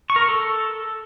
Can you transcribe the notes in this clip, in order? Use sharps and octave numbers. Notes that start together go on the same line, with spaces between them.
C#6
A#4
C#6
A4